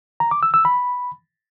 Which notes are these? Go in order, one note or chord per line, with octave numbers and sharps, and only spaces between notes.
A#5
D6
E6
E6
B5